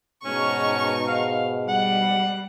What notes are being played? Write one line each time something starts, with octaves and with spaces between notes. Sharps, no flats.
G#2 B2 C#4 D#4 C#6
F5
G3 F#5